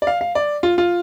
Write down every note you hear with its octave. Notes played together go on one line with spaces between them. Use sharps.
D5
F5
F5
D5
F4
F4